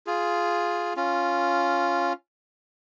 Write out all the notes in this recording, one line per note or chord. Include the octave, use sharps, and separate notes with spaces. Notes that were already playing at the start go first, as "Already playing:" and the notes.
F4 G#4
C#4 F4